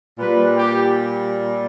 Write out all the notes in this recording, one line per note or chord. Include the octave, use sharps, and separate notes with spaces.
A#2 G3 B4
G4